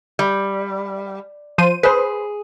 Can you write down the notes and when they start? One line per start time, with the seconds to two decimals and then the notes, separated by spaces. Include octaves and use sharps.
0.19 G3
1.58 F3 C5 D#7
1.83 G#4 B4 C5